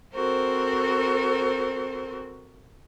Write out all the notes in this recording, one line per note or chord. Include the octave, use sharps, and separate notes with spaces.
C4 F#4 A4 A#4 C5